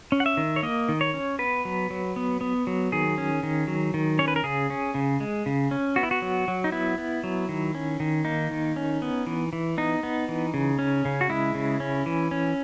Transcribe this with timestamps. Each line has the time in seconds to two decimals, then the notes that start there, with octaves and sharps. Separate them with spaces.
0.12 C#4
0.20 F#5
0.26 E5
0.37 D#3
0.56 C#5
0.63 A#3 D#5
0.89 D#3
1.01 C#5
1.14 C#4
1.39 B3 B4
1.65 F#3
1.90 F#3
2.16 B3
2.41 B3
2.67 F#3
2.92 D#3 G#4
3.18 C#4
3.43 D#3
3.67 F#3
3.94 D#3
4.19 C#4 C#5
4.28 B4
4.36 A#4
4.44 C#3 G#4
4.70 C#4
4.94 C#3
5.20 G#3
5.46 C#3
5.71 C#4
5.96 B3 F#4
6.03 E4
6.11 F#4
6.22 F#3
6.48 F#3
6.64 D#4
6.72 B3 E4
6.98 B3
7.24 F#3
7.49 D#3
7.75 C#4
8.00 D#3
8.25 A#3 D#4
8.51 D#3
8.76 C#4
9.02 B3
9.27 E3
9.53 E3
9.78 B3 D#4
10.03 B3
10.29 E3
10.54 C#3
10.79 C#4
11.05 C#3
11.21 F#4
11.30 G#3 E4
11.55 C#3
11.80 C#4
12.06 E3
12.31 C#4